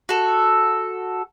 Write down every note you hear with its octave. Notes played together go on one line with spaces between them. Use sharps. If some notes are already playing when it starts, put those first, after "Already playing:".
F#4 A4